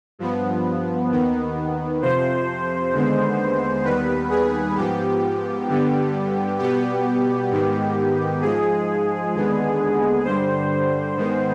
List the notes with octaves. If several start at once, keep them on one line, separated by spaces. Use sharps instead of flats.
G2 F3 B3
D#2 D#3 B3
F2 C3 F3 C5
D#2 D3 G#3 B3
D#2 D#3 G3 B3 B4
G#4
G#2 F3 B3 G4
G2 D3 G3 B3
B2 G3 B3 G4
G#2 D#3 B3
G#2 F3 G#3 G#4
D#2 D3 G#3 B3
G2 D3 G3 C5
G#2 D#3 G#3 B3